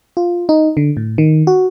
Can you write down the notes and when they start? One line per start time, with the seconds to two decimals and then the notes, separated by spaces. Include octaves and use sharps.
0.17 F4
0.49 D#4
0.77 D3
0.97 A2
1.18 D#3
1.47 F#4